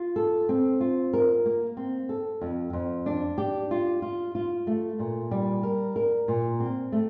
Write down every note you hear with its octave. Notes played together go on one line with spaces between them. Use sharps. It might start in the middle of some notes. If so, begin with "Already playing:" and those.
Already playing: F4
A4
C4
F4
A#4
A#3
C4
A4
F2
F2
D4
G4
F4
F4
F4
A3
A#2
G3
A#4
A#4
A#2
C4
A3